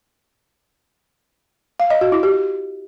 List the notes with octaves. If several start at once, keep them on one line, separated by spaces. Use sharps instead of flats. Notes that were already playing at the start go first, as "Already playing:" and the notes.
F5
D#5
F#4
E4
G4